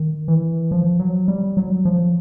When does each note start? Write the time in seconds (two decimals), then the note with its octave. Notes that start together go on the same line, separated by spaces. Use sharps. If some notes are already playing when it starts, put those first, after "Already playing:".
Already playing: D#3
0.28 E3
0.71 F3
1.00 F#3
1.28 G3
1.57 F#3
1.85 F3